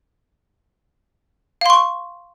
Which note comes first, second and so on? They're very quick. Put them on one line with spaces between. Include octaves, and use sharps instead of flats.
F5 C6 C#6